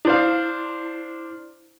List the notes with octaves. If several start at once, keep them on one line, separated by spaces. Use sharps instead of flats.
D4 E4 C5 F5